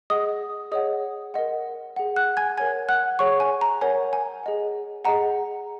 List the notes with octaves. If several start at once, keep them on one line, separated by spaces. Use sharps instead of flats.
G#4 D#5 F#5 D#6
G#4 C#5 D#5 F#5 D#6
A#4 D#5 F#5
G#4 F#5
F#5 F#6
G#5 G#6
A#4 C#5 F#5 G#5 G#6
F#5 F#6
G#4 C#5 F#5 C#6
G#5
A#5
A#4 C#5 F#5 G#5
G#5
G#4 D#5 F#5
G#4 D#5 F#5 A#5